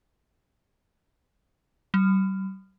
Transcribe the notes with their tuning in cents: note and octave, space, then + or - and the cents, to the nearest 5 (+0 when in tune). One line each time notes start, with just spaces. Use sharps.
G3 -40